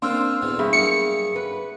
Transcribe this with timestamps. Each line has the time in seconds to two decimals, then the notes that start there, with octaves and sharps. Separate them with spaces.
0.02 A#3 C4 D4 F4 C5 C6 E6 F6
0.42 E2 B2 D3
0.59 G2 G#4 E5
0.73 F#3 A#3 C#7
1.36 B4